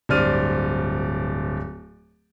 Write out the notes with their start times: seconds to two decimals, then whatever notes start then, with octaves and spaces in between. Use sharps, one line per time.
0.09 D1 G2 C5 D5 F6 D#7